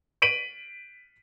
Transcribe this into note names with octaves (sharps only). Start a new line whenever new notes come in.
B6 D7 D#7 F#7